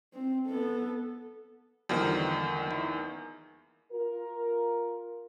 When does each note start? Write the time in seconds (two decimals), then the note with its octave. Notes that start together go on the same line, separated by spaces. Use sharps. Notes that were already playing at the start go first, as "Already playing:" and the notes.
0.14 C4
0.47 B3 A4
1.89 E2 D3 D#3 F3 G3 A#3
2.71 E4
3.92 F4 A#4